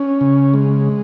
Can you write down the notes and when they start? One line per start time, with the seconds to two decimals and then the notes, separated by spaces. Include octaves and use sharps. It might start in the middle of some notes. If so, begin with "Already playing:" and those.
Already playing: C#4
0.21 C#3
0.54 G#3